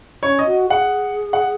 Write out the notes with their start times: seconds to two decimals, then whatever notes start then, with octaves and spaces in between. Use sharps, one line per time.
0.23 C#4 C#5
0.39 D#5
0.46 F#4
0.69 G#4 F#5
1.33 F#5